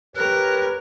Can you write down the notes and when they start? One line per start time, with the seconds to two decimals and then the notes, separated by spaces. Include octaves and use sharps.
0.16 G4 A#4 B4 C#5 F#6